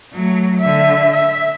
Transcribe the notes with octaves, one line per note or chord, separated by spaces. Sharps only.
F#3 A3
D3 E5
E5